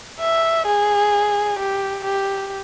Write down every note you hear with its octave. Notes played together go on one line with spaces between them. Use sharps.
E5
G#4
G4
G4